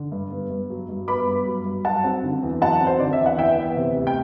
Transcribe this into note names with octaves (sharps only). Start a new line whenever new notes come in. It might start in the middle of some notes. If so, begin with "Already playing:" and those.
Already playing: D3
G2
B3
G2
F#3
G2
B3 B5 D6
G2
F#3
G2
F#3 F#5 A5
C4
D3
E2
F#3 F#5 A5
C4
C5
D3 D5
E5
E2
F#5
E3 E5 G5
B3
C3
D2
G5